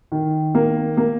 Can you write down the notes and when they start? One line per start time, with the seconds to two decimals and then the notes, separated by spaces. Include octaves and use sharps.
0.12 D#3
0.55 A#3
0.97 A#3